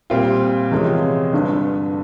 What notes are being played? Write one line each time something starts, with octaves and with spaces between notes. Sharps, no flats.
A#2 G3 C4 F4
E2 C3 F3 G#3 C#4
G1 G2 D3